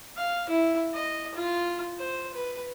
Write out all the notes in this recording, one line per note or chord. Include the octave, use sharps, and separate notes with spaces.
F5
E4
D#5
F4
C5
B4